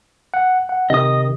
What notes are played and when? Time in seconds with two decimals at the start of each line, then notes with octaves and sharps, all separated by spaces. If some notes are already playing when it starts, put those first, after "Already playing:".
0.34 F#5
0.69 F#5
0.90 C3 D#3 D#5 D#6